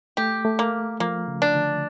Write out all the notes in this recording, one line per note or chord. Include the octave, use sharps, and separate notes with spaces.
A3 G4
A3
A#3
F3 A#3
C#3
D4
D3